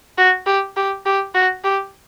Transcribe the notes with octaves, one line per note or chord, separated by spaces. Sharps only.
F#4
G4
G4
G4
F#4
G4